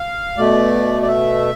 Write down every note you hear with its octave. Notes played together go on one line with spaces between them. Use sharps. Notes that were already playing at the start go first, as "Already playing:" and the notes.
Already playing: F5
B2 A3 D5
D5
E5